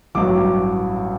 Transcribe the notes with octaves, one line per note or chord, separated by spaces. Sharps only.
A1 G2 F#3 D6